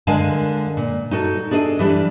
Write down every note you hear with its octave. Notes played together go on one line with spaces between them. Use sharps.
D3 G#3 A#4 F5 G#5 A5
A#2
D#4 F#4 A4
D4 G#4 A4 D#5
E3 G3 D4